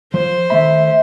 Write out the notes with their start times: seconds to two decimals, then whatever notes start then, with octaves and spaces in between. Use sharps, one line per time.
0.14 F3 C5
0.50 D#3 A3 E5 B5